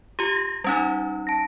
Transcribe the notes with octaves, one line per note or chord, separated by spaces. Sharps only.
F4 G4
A#6
G3 C#4 D#4
A5 A#6